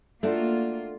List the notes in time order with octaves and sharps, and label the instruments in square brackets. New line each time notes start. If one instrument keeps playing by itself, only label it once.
[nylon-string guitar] A3 D4 F#4 [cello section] A#3 F4